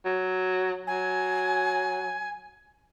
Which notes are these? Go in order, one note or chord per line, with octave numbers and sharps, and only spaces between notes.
F#3
F#3 G#5